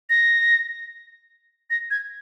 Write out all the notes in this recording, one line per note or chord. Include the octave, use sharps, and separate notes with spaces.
A#6
A#6
G#6